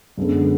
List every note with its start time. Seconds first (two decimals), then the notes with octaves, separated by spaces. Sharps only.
0.18 F#2 D3 G#3 B3